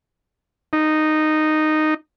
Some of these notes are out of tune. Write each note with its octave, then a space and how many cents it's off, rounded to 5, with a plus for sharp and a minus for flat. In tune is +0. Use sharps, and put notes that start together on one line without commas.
D#4 -10